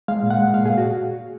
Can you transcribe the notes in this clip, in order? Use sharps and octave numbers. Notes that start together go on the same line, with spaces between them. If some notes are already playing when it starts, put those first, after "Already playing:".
G#3 F5
A#2
F#5
G#3
A#2 F5
A#2 G#4
F#4